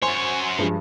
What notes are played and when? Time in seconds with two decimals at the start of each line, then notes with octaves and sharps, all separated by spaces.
0.02 F#2 C5 C#5 G#5 C6
0.58 G2 F3 G#3